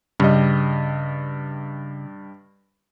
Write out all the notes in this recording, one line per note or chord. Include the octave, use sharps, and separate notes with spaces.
G2 C#3 G3 D#5